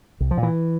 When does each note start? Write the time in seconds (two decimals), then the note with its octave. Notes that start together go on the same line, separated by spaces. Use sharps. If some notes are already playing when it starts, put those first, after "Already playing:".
0.20 C2
0.31 F3
0.37 A#2
0.43 E3